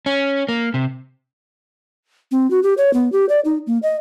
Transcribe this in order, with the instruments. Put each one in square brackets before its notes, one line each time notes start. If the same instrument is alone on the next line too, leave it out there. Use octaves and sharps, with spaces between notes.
[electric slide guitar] C#4
A#3
C3
[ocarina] C4
F#4
G4
C#5
B3
G4
D5
D#4
A#3
D#5